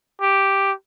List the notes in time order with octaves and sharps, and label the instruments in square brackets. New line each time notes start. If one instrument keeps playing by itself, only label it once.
[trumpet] G4